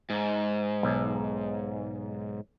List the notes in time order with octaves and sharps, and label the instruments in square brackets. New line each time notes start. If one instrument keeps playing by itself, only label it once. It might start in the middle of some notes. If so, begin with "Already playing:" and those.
[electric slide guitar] G#2
[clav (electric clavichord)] B1